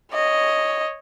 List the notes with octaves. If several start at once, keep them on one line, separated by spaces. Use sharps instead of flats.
C#5 D#5